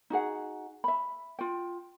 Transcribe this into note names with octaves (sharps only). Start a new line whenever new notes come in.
D#4 F#4 G#4 F#5
E5 B5
F4 G5